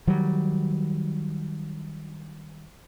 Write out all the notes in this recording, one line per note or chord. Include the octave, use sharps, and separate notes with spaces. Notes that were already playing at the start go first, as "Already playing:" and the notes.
D#3 F#3 G3